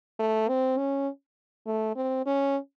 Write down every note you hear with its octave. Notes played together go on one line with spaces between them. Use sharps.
A3
C4
C#4
A3
C4
C#4